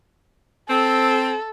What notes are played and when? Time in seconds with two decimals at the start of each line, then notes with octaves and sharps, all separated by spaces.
0.70 C4 A4